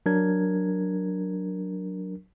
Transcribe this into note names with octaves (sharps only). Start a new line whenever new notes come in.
F#3 D4 A#4 G#6